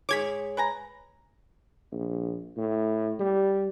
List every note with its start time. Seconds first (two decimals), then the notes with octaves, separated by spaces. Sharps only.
0.09 G#2 G#4 C#5 D6 G#6 B6
0.57 B4 G#5 A#5
1.92 A#1
2.57 A2
3.19 G3